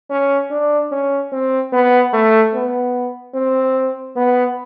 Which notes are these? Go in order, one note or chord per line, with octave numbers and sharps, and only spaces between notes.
C#4
D4
C#4
C4
B3
A3
B3
C4
B3